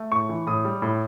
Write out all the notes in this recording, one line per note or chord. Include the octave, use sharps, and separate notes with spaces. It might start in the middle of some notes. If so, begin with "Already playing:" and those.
Already playing: A3
A2 C#6
E3
A2 D#6
G3
A2